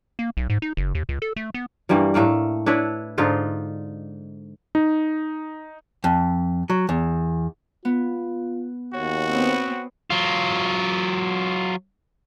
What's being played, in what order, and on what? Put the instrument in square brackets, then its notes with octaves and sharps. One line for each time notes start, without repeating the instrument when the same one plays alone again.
[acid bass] A#3
B1
G#2
D#4
F#1
D#2
C#2
A4
A3
B3
[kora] G2 E3 G3 A#3
A2 A3 A#3 A#4
D4 E4 B4 C#5
G#2 D3 D#4 F4
[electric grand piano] D#4
[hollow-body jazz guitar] F2
F#3
E2
[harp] B3 [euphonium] F4
[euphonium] D#2 [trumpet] F#4 [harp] C#5
[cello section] B3 C4
[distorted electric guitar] F#3 F4